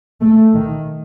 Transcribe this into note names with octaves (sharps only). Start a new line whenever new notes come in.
A3
D#3